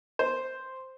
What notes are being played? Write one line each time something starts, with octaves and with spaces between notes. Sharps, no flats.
C5